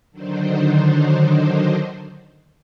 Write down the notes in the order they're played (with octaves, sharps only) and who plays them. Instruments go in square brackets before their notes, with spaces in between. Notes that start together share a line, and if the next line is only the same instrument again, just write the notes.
[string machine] D3 D#3 F#3 D4 D#4 C5